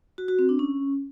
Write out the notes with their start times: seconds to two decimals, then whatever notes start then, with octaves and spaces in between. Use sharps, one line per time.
0.18 F#4
0.28 F#4
0.39 C4
0.49 D4
0.59 C#4